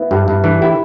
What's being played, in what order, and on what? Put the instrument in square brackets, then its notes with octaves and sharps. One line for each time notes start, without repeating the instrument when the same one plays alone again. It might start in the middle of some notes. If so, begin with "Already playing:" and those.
Already playing: [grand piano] B3 E4
[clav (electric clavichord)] G2 [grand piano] G4
[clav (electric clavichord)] G2 [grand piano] E4
[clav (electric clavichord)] E3 [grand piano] D4
[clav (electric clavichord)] E4 [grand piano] G4